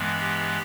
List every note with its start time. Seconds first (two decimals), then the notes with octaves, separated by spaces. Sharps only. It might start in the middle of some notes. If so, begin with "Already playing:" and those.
Already playing: G2 E3 G#3 B3
0.20 G4